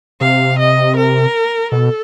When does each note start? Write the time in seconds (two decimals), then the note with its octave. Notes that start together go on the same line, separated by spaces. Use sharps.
0.21 C3 F5
0.59 D#5
0.97 A#4
1.72 B2 A4